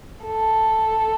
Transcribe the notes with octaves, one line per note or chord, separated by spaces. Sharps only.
A4